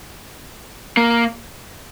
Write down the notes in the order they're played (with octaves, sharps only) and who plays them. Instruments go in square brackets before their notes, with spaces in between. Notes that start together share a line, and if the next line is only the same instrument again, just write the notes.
[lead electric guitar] A#3